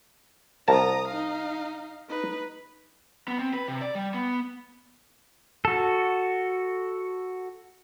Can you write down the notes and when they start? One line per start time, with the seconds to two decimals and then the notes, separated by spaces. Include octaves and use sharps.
0.68 C2 A#4 A5 A#5 D#6
1.08 D#4 F5
2.08 D#4 B4
3.28 B3
3.39 C4
3.54 B4
3.68 C3
3.81 D5
3.95 G3
4.14 B3
5.65 F#4 A4